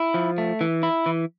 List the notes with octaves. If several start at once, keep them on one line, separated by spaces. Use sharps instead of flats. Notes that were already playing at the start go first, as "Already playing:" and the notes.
Already playing: E4
F3
A3
E3
E4
E3